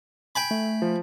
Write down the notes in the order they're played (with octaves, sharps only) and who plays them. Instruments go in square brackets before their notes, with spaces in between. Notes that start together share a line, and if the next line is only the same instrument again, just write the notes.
[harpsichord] G5 G#5 B5
[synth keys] A3
[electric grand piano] F3